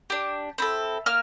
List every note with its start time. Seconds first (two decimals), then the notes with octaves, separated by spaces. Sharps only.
0.10 D4 G4
0.58 C4 E4 A4
1.06 A#3 F6